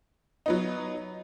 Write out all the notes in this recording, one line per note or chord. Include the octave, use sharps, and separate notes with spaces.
F#3 B3 D#4